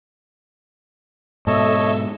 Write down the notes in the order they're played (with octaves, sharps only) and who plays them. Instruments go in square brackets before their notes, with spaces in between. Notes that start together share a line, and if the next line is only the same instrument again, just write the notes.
[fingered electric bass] G#2 B2 [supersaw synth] A4 E5 E6 [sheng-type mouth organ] C#5 D#5